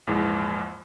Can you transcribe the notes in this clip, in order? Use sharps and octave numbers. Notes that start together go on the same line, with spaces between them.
A#1 E2 G#2 E3 G#3